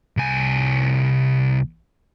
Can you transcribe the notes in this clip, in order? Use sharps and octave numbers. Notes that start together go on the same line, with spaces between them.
C2 G#5